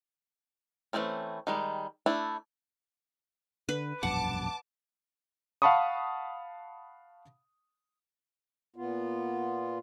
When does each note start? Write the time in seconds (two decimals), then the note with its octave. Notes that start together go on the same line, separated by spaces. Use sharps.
0.93 E3 G#3 A3 C4 C#4
1.47 D#3 G3 G#3
2.06 A3 D4 E4
3.69 D3 B4
4.03 E1 A#1 F#2 F#5 A5 D6
5.62 F5 F#5 A5 B5 C#6 D#6
8.76 A#2 B3 F4